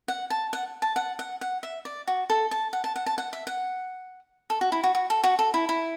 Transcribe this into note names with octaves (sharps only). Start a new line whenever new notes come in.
F#5
A5
F#5
A5
F#5
F#5
F#5
E5
D5
F#4
A4
A5
F#5
A5
F#5
A5
F#5
E5
F#5
A4
F#4
E4
F#4
F#4
A4
F#4
A4
E4
E4